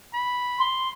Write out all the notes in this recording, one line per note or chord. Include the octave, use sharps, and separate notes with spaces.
B5
C6